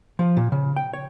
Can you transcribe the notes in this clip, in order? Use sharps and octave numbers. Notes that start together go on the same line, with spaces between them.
F3
A#2
C#3
G5
C#5